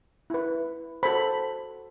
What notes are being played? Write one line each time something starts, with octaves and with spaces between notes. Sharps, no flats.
E4 B4
F#4 A4 C5 B5